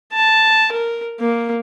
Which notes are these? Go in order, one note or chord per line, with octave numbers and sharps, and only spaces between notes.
A5
A#4
A#3